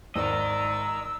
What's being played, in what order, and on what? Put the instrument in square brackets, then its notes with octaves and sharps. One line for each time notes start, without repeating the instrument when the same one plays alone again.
[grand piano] G#1 [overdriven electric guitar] A#4 D#5 [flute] D5 [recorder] E6